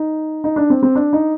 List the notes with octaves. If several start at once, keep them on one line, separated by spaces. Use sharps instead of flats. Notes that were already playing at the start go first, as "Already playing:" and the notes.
Already playing: D#4
D#4
D4
C4
C4
D4
D#4